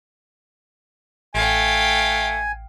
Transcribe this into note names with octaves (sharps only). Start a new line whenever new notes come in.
A1 A3 F5 G5 G#5